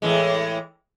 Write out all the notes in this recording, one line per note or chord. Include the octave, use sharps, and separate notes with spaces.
A2 E3 G#3